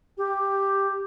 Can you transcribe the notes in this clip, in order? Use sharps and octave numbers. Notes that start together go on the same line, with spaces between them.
G4